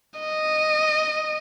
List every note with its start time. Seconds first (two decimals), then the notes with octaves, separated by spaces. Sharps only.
0.20 D#5